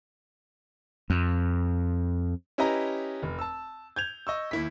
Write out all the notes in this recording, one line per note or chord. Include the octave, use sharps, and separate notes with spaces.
F2
C#4 E4 G4 B4 D#5 A#5
F1
A5 E6
G6 G#6 F7
D#5 C#6 E6
D#2 E4 B6